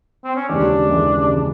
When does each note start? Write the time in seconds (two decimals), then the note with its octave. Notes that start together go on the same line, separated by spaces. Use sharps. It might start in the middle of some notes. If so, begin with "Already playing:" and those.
0.24 C4
0.36 C#4
0.49 D#2 C#3 E3 G#3 D4
0.88 D#2 C#3 E3 G#3
1.27 C#3 E3 G#3